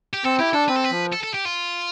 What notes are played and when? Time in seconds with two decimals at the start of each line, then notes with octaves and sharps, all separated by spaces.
0.13 G4
0.24 C4 A4
0.39 E4 G4
0.53 D4 A4
0.68 C4 B4
0.76 A4
0.84 B4
0.91 F3
1.13 A4
1.23 A4
1.34 G4
1.45 F4